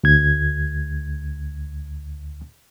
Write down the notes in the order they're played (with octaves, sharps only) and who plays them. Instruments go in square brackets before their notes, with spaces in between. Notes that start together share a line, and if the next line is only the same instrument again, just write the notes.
[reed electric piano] D2 G#6